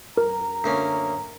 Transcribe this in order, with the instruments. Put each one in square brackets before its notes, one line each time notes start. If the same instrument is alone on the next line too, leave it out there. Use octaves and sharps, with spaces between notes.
[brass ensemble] F#2 A#5 [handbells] A#4
[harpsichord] D2 A#3 C#4